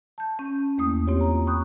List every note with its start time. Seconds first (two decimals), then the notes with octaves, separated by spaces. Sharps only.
0.18 A5 G6
0.39 C#4
0.78 E2 A3 A#3 D#6
1.07 C4 F4 G4 C#5
1.21 A#5
1.46 G5 B5 C#6 D#6 F#6 G6